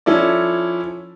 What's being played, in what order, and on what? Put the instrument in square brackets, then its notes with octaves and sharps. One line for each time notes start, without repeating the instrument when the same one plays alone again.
[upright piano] F3 C#4 E4 A4 D5